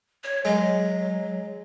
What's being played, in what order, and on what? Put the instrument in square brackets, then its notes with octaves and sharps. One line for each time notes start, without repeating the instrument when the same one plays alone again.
[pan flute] C#5
[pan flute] F#3 [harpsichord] G#3